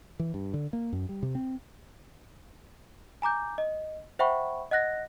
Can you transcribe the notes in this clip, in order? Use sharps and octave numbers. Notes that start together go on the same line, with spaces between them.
E3
G2
D3
A#3
F#2
G3
C3
C4
G#5 A#5 D6 G6
D#5
C5 E5 F#5 G5 B5 C#6
D#5 F#5 F#6 A#6